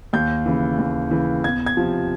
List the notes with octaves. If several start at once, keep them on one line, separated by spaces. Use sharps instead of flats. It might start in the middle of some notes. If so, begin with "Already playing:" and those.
D#2 G6
C#3 E3
D#2
C#3 E3
E2 G#6
G#6
C3 F3